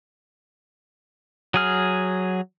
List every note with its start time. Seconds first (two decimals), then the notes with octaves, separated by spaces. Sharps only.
1.54 F#3 G#4 F6